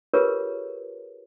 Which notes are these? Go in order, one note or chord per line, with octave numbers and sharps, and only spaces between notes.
F4 G4 G#4 A#4 B4 C#5